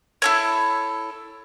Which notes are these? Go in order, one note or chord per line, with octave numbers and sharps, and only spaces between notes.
E4 A4 C#5